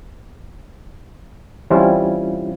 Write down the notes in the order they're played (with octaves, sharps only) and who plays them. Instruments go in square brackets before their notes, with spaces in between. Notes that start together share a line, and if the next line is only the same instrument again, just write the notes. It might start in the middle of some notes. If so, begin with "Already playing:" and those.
[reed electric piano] E3 G3 C4 C#4 E4 F4